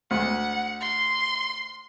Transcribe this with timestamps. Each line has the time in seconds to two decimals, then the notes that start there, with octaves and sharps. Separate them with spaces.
0.11 D2 F#5
0.81 C6